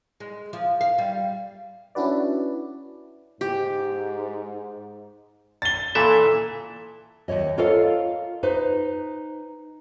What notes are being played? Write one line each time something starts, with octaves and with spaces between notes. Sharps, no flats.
G#3
F3
F5
G3
C#4 D4 E4 F#4 B4 D5
G#2 G4
A6 G7
A#2 E3 A4 E5
D#2 D#3 C#5 D#5
F4 A4 A#4 C#5 D#5 F5
D#4 B4 C5